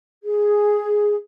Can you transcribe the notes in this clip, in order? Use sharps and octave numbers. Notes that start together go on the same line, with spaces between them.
G#4